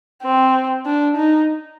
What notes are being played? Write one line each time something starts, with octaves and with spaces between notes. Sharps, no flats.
C4
D4
D#4